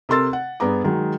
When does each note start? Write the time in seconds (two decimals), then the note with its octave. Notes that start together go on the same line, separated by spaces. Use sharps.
0.09 C3 A4 A#4 C6 E6 A6
0.33 F#5
0.60 G2 B3 G#4 A#5 D6
0.84 D#3 F#3 G#3